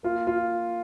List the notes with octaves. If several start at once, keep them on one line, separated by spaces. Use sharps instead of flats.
A#3 F4
F4